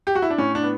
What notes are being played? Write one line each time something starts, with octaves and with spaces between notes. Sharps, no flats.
G4
F#4
E4
D4
A2 C#4
D4
B3